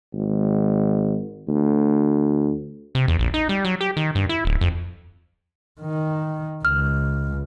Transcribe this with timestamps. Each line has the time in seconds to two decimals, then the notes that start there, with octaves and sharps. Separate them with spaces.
0.14 G#1
1.48 D2
2.95 C3
3.08 E2
3.19 A#1
3.34 D#4
3.49 G3
3.65 F#3
3.81 G4
3.97 D#3
4.15 G2
4.29 E4
4.45 D1
4.61 F2
5.81 D#3
6.65 C#2 F6